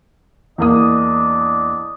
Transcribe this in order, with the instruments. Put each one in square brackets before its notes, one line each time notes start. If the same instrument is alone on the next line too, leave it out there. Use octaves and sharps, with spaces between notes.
[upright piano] E2 A#3 D#6 [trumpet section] D4 D#5